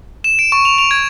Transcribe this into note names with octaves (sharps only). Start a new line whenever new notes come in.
E7
D7
C#6
F7
F7
G#6